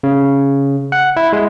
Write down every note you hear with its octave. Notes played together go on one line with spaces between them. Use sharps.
C#3
F#5
E4
G#3